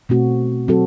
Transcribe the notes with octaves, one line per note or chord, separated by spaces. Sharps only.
B2 A3 C4 F#4
F#3 C4 F#4 A4